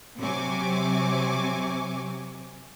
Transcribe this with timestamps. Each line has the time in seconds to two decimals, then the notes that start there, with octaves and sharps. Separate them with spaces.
0.19 C3 F#3 C4 G#5 C#6 D6